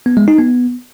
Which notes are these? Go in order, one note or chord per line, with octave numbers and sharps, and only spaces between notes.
B3
G#3
D#4
B3